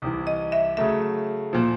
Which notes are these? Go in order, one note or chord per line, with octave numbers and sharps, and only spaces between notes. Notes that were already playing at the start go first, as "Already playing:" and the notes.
C2 C3 E3
D#5
E5
C#3 F#3 A3 E5
A#2 F3